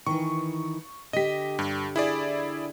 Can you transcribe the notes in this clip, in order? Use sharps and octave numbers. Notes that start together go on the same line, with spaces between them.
D#3 E3 C#6
D3 G4 D#5 B6
G2
E4 G#4 D5